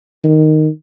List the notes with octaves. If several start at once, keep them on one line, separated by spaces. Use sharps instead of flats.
D#3